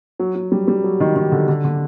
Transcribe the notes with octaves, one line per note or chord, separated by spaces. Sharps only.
F#3
F#3
G3
G3
F#3
D#3
D#3
D3
D3
D3